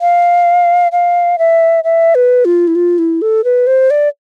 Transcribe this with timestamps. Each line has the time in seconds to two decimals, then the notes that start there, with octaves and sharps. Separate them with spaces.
0.01 F5
0.92 F5
1.38 E5
1.84 E5
2.15 B4
2.45 F4
2.67 E4
2.75 F4
2.98 E4
3.22 A4
3.44 B4
3.67 C5
3.90 D5